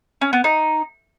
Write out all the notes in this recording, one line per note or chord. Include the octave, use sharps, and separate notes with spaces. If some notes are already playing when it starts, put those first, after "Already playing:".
C#4
B3
D#4